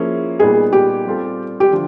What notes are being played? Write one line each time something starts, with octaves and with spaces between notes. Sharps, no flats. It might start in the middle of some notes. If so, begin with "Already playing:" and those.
Already playing: F3 A#3 C#4 E4 G#4
A#2 G3 B3 D#4 G#4
G4
G3 C4 F4 A4
G4
D3 F3 A3 F4